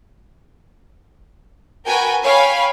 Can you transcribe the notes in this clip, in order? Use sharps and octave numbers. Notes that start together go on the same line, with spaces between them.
F#4 A#4 B4 G5 G#5
C#5 F5 G5 G#5 B5